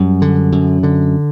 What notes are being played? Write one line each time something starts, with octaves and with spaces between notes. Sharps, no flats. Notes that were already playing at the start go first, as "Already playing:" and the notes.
Already playing: F#2 G3
D3
F#2
D3